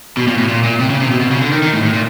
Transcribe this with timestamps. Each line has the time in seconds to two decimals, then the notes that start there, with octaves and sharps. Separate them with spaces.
0.17 B2
0.27 A#2
0.38 A2
0.48 A#2
0.64 A#2
0.79 C3
0.90 C#3
1.00 C3
1.10 B2
1.21 B2
1.31 C#3
1.41 D3
1.52 D#3
1.62 D#3
1.73 A2
1.83 A2
1.93 A#2